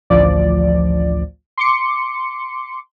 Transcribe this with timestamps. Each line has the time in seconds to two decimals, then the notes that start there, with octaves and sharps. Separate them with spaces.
0.10 A1 D2 F3 D5
1.58 C6 D6 C#7